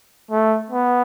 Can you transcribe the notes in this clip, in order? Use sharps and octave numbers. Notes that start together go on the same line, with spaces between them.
A3
B3